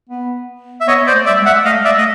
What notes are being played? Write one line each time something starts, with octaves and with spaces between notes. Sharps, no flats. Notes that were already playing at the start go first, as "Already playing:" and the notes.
B3
E5
B3 C#5 D#5
C5 D5
A3
G3 D5 E5
G#3
E5 F#5
A3 D#5 F5
D5 E5
A3 D#5